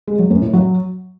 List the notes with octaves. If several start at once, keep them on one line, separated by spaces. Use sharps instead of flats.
G#3
F#3
F#2
A2
F#3